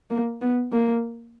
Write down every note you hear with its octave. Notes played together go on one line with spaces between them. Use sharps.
A#3
B3
A#3